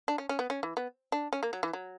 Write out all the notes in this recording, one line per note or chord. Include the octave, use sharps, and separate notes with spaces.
D4
C#4
C#4
B3
C#4
E3
B3
D4
C#4
A#3
F#3
E3
F#3